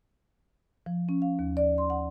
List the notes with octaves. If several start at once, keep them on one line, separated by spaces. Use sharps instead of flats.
F3
C#4
F5
D#2
D5
C6
F#5